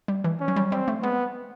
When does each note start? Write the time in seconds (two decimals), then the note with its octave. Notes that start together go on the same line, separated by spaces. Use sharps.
0.08 G3
0.24 E3
0.40 C#4
0.48 F#3
0.56 G3
0.71 G3 C4
0.88 A3
1.02 G#3 B3